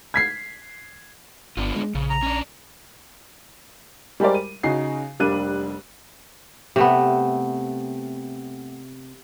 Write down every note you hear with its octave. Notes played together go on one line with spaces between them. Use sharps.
G#6 B6 C7
G1 B3 D4 F4
G#3
A#1 C#3
A#5
C#4 D4
G3 G#3 G4 A#4 C5 D5
D#7
C#3 D#4 F#4 C7
F1 G3 A#3 D4 F#6 D#7
C3 A3 B3